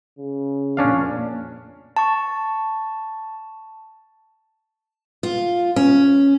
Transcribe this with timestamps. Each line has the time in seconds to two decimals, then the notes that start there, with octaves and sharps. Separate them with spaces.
0.19 C#3
0.77 F2 A#2 C#4 D4 F5
1.96 A5 C#6
5.23 F4
5.76 C#4